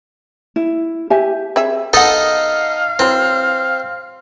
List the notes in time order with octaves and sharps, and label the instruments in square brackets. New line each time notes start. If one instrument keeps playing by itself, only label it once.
[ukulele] E4
G4 E5 G#5
[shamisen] C4 G#4 E5
[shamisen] B3 F#5 [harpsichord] D#4 A4 D#5 [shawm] F5
[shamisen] E3 F#3 [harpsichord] C4